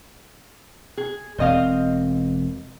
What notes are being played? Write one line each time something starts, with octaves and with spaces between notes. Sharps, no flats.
G#4
E1 C4 C5 D#5 F5